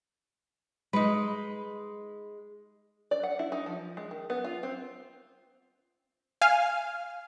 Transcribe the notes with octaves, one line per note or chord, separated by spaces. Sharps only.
G#3 D#4 B4
D5
F#5
E4
D#4
F3
G#3
D#3
B3
F4
C4
F5 G#5 F6